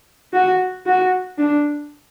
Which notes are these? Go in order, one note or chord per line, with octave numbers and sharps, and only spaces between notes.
F#4
F#4
D4